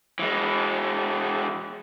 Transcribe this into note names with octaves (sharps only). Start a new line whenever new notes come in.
E3 G#3